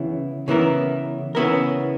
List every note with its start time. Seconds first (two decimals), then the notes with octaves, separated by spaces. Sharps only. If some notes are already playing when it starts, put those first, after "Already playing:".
Already playing: C#3 E3 B3 E4
0.48 C#3 E3 B3 E4 A#4
1.35 C#3 E3 B3 E4 A#4